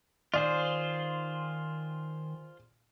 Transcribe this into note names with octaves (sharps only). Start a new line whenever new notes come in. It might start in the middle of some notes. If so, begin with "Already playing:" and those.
D#3 F4 G#4 C5 D5